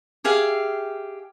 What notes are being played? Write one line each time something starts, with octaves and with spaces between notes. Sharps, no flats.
G4 G#4 E5 F5